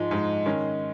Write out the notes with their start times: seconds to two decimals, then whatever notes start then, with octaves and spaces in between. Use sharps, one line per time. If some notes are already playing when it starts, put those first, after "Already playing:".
Already playing: G#2 F3 G#3
0.11 G#2 F3 G#3
0.46 D#3 G#3 C#4